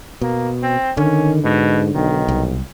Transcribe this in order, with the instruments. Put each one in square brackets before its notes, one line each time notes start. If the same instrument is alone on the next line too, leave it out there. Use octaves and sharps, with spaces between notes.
[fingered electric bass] B2 [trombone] A#3
[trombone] C4
[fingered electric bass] D3 [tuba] D#3 [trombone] C#4
[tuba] G#2 [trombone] B2
[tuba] B1 [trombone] D#3
[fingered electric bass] C2